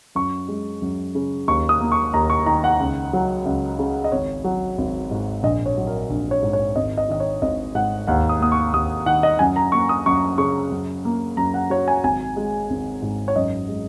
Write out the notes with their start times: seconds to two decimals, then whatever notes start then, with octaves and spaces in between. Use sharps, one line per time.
0.15 F#2 C#6
0.48 G#3
0.82 F#2
1.15 C#3
1.48 D#2 C#6
1.69 D#6
1.80 A#3
1.92 C#6
2.13 D#2 A#5
2.30 C#6
2.46 D#3 A#5
2.64 F#5
2.80 C#2
3.13 F#3
3.46 C#2
3.79 C#3
4.04 D#5
4.12 G#1 C#5
4.44 F#3
4.78 G#1
5.11 G#2
5.43 A#1 D#5
5.66 C#5
5.77 F#3
5.87 A#4
6.10 A#1
6.31 C#5
6.42 G#2
6.53 C#5
6.76 G#1 D#5
6.97 D#5
7.09 D#3 D#5
7.20 C#5
7.42 G#1 D#5
7.75 G#2 F#5
8.07 D#2 F#5
8.29 D#6
8.40 A#3 D#6
8.52 C#6
8.73 D#2 D#6
9.06 D#3 F#5
9.23 D#5
9.39 F#2 G#5
9.56 A#5
9.72 A#3 C#6
9.89 D#6
10.06 F#2 C#6
10.38 C#3 C#6
10.71 F#2
11.05 A#3
11.37 F#2 A#5
11.54 F#5
11.70 F#3 C#5
11.88 G#5
12.04 G#1 G#5
12.36 G#3
12.70 G#1
13.02 G#2
13.28 C#5
13.36 F#2 D#5
13.68 G#3